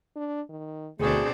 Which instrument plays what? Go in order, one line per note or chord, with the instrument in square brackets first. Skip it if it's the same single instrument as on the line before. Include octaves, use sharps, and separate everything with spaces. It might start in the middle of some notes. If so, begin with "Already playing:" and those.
[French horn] D4
D#3
[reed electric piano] D2 [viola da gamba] B2 C4 D4 [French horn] A3 [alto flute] G#4